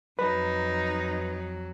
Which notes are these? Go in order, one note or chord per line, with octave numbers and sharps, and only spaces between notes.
F2 F#3 D#4 B4